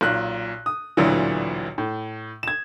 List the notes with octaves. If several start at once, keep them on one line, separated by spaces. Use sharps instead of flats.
B1 A#2 F#6
D#6
A1 D2 A#2 D3 E3 F#3
A2
G#6 E7